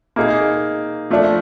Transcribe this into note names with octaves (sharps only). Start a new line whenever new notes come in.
A#3 D#4 G#4
F3 A3 D4